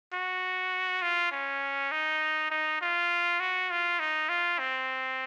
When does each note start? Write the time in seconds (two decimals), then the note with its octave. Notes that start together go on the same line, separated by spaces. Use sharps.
0.13 F#4
1.02 F4
1.31 C#4
1.91 D#4
2.51 D#4
2.81 F4
3.40 F#4
3.70 F4
4.00 D#4
4.29 F4
4.59 C4